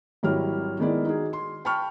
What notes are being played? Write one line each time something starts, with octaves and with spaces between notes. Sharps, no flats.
G#1 F#3 G3 E4 F6
D#3 G#3 B3 E4 D5
D#4 F#4 G#4
C6
G5 A5 B5 C#6 F6